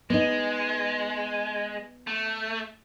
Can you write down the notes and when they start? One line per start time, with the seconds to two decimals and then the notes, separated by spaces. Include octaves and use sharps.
0.10 G#3 B3 D#4
2.07 A3